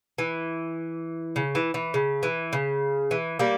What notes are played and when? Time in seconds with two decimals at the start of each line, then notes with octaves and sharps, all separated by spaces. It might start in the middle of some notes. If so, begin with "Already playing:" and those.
0.18 E3
1.36 C#3
1.55 E3
1.74 E3
1.94 C#3
2.23 E3
2.53 C#3
3.11 E3
3.39 G3 A#3